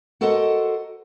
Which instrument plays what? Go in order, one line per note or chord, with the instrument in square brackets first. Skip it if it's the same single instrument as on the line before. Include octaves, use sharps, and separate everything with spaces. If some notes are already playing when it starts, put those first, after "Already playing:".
[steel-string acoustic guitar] F#4 A4 A#4 C5 D#5 F#5